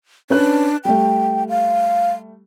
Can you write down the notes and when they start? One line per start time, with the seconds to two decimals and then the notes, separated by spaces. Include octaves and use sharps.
0.30 C#4 D4 B4 F#6
0.85 G3 A3 G5
1.49 F5